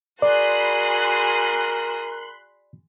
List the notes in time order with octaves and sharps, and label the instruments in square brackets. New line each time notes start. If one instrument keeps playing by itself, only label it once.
[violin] F#4 G#4 [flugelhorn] A#4 [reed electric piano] D5 [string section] B5 C6 F#6